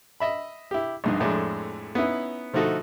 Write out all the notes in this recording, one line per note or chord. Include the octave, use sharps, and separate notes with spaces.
D#5 E5 B5
E4 G4
A#1 G2 D#4
F2 A2 G#3 D4
B3 C#4 D#4 E4 B4
D3 F3 A3 D#4 F#4 A4